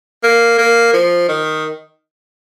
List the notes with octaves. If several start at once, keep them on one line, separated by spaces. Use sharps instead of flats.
A#3
A#3
F3
D#3